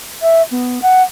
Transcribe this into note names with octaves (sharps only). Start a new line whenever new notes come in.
E5
B3
F#5